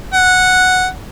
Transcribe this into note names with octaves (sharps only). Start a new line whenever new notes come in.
F#5